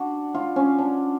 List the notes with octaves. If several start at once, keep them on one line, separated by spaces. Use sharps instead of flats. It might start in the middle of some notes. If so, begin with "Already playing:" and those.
Already playing: B3 D4 F#4
F4
C#4
D4